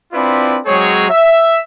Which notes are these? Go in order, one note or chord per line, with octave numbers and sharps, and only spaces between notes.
C4 D4 E4 F4 B4 D5
F#3 G#3 C4 G#4 C#5
E5